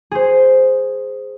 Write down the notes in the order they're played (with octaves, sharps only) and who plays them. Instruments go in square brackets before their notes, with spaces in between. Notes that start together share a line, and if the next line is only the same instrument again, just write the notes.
[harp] G#4 C5